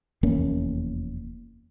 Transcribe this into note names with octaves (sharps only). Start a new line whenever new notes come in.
F1 E2 A#3 C#4